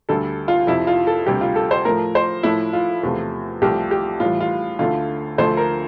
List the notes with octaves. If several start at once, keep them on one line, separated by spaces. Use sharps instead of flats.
D2 D3 G3 A4
F4
F2 C3 F3 E4
F4
A4
D2 C3 G3 G4
F4
A4
C5
A2 F3 A3 A#4
C5
A2 F3 A3 E4
F4
E2 C3 F3 A3
C2 C3 F3 A3 G4
G4
A2 E3 G3 F4
F4
D2 D3 A3 F4
D2 D3 F3 A3 C5
A#4